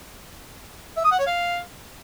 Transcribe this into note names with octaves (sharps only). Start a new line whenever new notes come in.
E5
D#6
F#5
C#5
F5